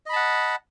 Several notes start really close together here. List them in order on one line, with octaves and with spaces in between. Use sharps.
D#5 B5 A5 F#5